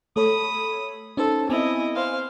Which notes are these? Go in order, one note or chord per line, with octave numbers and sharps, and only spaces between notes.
A3 A4 C#5 B5 D#6
C#4 D#4 A4 C5
B3 C4 E4 D#5 G#5
C5 F5